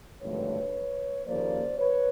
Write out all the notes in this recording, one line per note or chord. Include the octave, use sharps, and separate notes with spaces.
G#1 G2 D3 F3 A3 B4 C#5
D#2 C#3 F3 A#3 C5 D5
B4 C#5